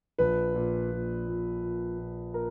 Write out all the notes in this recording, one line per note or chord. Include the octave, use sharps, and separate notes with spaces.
A#1 B4
A#2
A#2
A#2
A#2
A#2
A#2 A#4